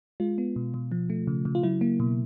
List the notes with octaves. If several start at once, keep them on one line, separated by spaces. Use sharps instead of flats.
G#3 F4
B3
B2
B2
F3
A3
C#3
C#3
F4
F#3 E4
A#3
B2